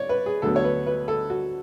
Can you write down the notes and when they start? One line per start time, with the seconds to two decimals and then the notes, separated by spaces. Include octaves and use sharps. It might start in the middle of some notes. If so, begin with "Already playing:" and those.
Already playing: C#5 D5
0.09 B4
0.26 G#4
0.42 D2 D3 F#3 B3 A4
0.56 C#5
0.64 B4
0.86 B4
1.08 A4
1.30 F#4